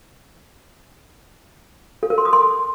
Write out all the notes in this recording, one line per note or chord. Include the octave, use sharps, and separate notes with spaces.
A4
A#4
C6
D#6
C6